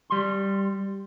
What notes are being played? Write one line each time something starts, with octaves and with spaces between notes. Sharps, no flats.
G3 C6